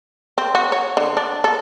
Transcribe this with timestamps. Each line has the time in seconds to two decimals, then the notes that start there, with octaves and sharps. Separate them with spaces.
0.38 C4
0.55 F#4
0.72 C#5
0.97 D3
1.17 D4
1.44 A4